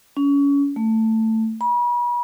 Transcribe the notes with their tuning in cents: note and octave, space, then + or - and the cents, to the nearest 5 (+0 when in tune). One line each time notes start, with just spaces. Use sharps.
C#4 +30
A3 +15
B5 -40